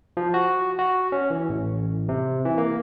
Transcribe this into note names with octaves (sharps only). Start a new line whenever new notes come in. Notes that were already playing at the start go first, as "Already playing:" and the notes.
F3
F#4
F#4
C#4
E3
A1
C3
E3
A#3